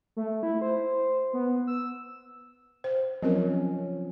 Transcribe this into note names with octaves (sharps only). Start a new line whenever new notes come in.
A3
E4
C5
B3
E6
C5
F3 F#3 C4 C#4 A#4